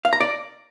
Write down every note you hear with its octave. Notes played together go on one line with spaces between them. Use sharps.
F5
A#5
D5